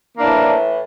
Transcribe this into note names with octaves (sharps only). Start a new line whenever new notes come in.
A2 E3 A#3 D4